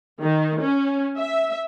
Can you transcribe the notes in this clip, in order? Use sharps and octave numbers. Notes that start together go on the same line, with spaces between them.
D#3
C#4
E5